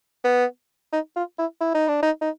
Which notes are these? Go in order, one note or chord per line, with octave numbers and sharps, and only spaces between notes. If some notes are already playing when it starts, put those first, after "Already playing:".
B3
D#4
F4
E4
E4
D#4
D4
D#4
D#4